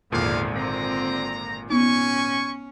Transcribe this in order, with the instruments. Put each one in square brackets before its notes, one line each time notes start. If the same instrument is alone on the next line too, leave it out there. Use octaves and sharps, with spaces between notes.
[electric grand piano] G#1 A#2 [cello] E2 D3 [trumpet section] G#3 E4 F5
[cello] D3 C4 [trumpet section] A#5
[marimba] B3 D#4 [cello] C#4 [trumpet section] G#5 C#6